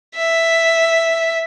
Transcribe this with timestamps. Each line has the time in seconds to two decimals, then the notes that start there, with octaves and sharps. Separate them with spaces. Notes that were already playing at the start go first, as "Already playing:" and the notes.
0.16 E5